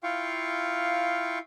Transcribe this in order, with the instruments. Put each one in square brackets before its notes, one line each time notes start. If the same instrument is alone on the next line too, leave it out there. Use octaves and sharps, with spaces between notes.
[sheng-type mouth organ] E4 F4 F5 G5 C#6